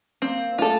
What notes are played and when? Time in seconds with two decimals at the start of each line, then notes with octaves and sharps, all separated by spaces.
0.22 A#3 C4
0.58 A3 F4 A4